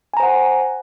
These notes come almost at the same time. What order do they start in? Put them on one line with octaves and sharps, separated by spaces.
G#5 A#5 C5 F#5